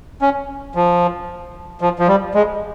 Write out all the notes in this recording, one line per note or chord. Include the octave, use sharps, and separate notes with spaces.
C#4
F3
F3
F3
G3
G#3